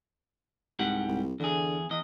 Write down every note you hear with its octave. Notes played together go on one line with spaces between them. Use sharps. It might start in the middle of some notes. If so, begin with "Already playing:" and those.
C2 G#2 G4 F#5
C2
E2 D3 G#4
E2 D#5